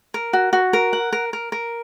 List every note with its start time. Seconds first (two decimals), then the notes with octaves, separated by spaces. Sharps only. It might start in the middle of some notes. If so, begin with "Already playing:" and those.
0.14 A#4
0.33 F#4
0.53 F#4
0.73 A#4
0.93 F#5
1.13 A#4
1.33 A#4
1.52 A#4